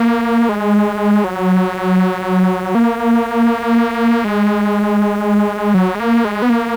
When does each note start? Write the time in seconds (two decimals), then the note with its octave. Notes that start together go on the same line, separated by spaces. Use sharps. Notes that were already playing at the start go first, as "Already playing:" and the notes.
Already playing: A#3
0.49 G#3
1.24 F#3
2.75 A#3
4.24 G#3
5.75 F#3
5.95 G#3
6.00 A#3
6.25 G#3
6.42 B3
6.50 A#3